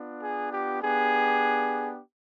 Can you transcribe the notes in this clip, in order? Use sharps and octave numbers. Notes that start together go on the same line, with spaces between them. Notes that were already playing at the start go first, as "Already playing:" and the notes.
Already playing: B3 D4 F4
G#4
G4
B3 D4 G4 G#4